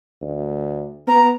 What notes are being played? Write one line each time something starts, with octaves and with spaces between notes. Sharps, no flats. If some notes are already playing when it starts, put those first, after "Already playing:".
D2
B3 A#5